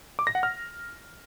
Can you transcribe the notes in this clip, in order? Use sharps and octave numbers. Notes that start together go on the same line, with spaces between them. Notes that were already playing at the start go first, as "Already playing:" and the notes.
D6
A#6
F#5
F6